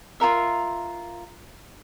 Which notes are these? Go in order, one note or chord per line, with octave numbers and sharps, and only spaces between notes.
F4 A4 A#4 E5